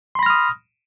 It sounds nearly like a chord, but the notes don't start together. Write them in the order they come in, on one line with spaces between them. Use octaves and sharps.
C6 B5 A#6 F6 D#6